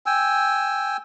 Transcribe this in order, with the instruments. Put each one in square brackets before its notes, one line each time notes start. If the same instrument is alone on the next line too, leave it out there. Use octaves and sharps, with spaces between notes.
[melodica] G5 G#5 E6